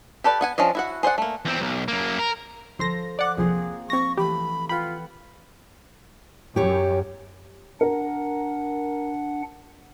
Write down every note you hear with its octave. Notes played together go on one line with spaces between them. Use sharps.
G4 A4 B4 D5
B3 F#5 G#5
F3 C#4 D4 D#5
E4 F#4 F#5
G#4 C5 D5 F#5
A3 A#3
E2 C4
B1
F#2 A#3
A#4
G1 F3 A4 C5 C6 A#6
D5 F#5 D6 F#6
C2 F2 F3 A#3 C4 G#4
C4 C#6 A#6
E3 A3 G4 B5
F4 B4 F#5 G5 B5
F#2 G4 C#5
D4 A#4 F#5